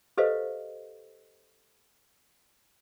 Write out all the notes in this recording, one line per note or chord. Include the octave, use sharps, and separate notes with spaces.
G4 A4 B4 C5 D#5 F5